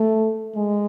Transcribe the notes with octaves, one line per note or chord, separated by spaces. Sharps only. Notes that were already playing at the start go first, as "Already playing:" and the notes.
Already playing: A3
G#3